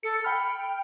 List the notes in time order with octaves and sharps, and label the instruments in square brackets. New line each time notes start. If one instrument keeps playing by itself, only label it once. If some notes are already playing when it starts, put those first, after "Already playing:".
[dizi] A4 [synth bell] C#7
[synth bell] G5 F6 [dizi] B5